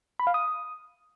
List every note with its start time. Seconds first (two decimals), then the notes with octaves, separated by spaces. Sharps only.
0.19 B5
0.27 F5
0.34 D#6